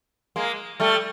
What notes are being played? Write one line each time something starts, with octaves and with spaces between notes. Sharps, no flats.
G#3 A#3
G3 A3